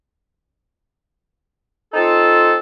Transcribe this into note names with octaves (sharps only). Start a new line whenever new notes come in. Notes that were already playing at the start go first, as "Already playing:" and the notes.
C4 D#4 F4 A4